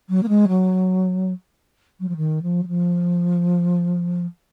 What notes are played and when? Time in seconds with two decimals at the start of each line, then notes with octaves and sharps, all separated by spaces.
0.09 F#3
0.23 A#3
0.28 G#3
0.48 F#3
2.00 F#3
2.08 F3
2.16 D#3
2.42 F3
2.63 F#3
2.67 F3